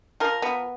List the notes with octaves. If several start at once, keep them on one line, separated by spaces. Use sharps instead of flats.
F3 A#4
B3